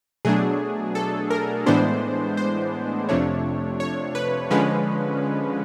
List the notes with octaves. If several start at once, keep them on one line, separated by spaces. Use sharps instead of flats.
B2 F#3 A3 D4 G#4
A4
A#4
A2 E3 G#3 B3 D4 C5
C5
F2 C3 F3 A3 D4 C#5
C#5
B4
D3 F3 G#3 C#4 B4